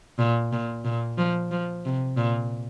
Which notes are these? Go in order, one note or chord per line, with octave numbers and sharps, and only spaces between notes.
A#2
A#2
A#2
F3
F3
C3
A#2